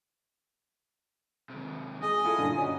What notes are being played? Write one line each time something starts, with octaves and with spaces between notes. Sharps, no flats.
D#2 C3
G#3 D#5 G#5
E4 F4 A4
G2 A#2 D3
C#4 D#4 F#4